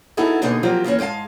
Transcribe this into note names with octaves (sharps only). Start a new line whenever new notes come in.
B3 D#4 E4 F#4 G#4 A4
B2 D3 A#3 B3 D#4 G#4
F3 F#3 A#3 C4 F4 G4
E2 D#3 A#3 C#4
G#2 G#3 F4 F5 A5